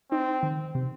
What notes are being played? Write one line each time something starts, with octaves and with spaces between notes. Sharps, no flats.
C4 D#4
D#3
C3